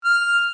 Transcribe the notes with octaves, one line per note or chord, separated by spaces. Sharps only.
F6